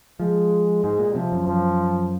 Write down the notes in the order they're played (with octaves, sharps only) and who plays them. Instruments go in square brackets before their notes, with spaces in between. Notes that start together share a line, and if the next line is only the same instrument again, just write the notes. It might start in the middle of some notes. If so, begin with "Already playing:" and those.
[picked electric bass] F3 [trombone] G#3
[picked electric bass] G#2 [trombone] G#3
[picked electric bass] A#2
[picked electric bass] C3 [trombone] F3
[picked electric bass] F#2
[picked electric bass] F#2 [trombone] F3